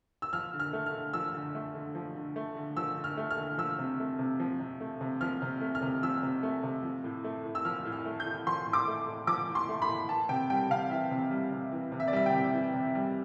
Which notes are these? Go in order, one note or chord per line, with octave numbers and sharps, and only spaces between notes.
E6
F3 F6
D3
F6
A3
F6
D3
F3 E6
D3
A3
D3
F3
D3
A3
D3
F3 E6
D3
F6
A3
F6
D3
F3 E6
C3
A3
C3
F3
C3
A3
C3
F3 F6
C3
A3
F6
C3
F3 E6
C3
A3
C3
F3
A2
A3
A2
E6
F3 F6
A2
F6
A3
G6
A2
F3 C6
A2
D6
A3
A2
F3 D6
A2
C6
A3
B5
A2
E3 A5
C3 G5
G3 G5
C3 F5
E3 E5
C3
G3
C3
E3
C3
E5
D5
G3 E5
G5
C3
E3
C3
G3